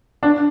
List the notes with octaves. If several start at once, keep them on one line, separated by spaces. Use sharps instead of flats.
D4